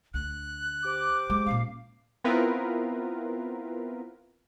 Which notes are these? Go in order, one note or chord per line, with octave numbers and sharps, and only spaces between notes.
D2 F#6
G4 C5 D6
G#3
A#2 C#4 F5
B3 C4 E4 F4 A#4 B4